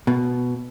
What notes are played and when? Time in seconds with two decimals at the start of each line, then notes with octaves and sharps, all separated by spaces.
0.07 B2